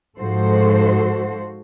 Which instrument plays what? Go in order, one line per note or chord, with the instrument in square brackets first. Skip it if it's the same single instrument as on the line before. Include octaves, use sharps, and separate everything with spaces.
[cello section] G#2 F3 F#4 A4 C5